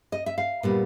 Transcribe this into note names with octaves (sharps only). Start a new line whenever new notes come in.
D#5
E5
F5
A#2 G3 B3